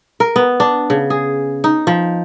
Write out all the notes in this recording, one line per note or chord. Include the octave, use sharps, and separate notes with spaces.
A#4
B3
D4
C#3
G#4
D#4
F3